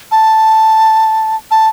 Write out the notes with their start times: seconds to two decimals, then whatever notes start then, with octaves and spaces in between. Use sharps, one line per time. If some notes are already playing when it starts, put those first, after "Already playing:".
0.11 A5
1.51 A5